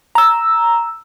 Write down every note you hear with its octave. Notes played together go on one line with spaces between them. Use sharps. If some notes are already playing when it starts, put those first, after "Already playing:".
A#5 E6